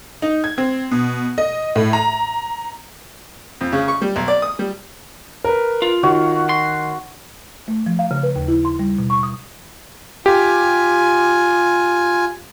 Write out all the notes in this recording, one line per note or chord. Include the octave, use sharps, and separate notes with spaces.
D#4
G#6
C4
B2
D#5
A2
A#5
F2
C#3
C#6
G3
B1
D5
D#6
G3
A#4 B4
F4
D#3 F#4 C#5
C6
A3
F3
F5
C#3
B4
D#2
E4
C6
G3
B2
C#6
D#6
F4 G4 G#5